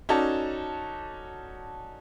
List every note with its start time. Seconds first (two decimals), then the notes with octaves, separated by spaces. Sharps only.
0.09 C#4 D#4 F#4 A4 D5 A5